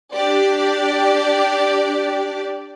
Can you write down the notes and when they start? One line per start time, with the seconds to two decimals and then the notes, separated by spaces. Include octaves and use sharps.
0.16 D4 G4 D5